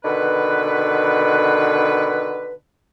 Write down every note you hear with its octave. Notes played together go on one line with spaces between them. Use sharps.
B2 D3 D#3 B4